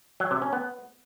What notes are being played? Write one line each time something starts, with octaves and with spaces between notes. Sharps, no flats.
F#3
C3
C#4
B3